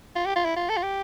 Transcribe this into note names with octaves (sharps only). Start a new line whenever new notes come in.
F4
G4
F4
E4
F4
A4
F4
G4